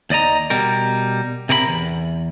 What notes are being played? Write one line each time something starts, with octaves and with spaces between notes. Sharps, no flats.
D#2 D5 D#5 A#5
B2 G3 A#4
C3 A#4 D5 B5
E2